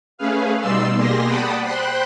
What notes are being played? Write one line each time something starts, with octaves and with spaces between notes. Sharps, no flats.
A3 C#4 G#4 B4 F5
B2 G3 D#4 D5 C6 E6
B2 A#3 G4 G#4 C6 A#6
D5 F#5 G5 A5 B5 D#6
C5 G5 B5 C6 F#6